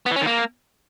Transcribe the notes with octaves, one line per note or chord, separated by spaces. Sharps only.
B3
E3
C#4
D#3
A#3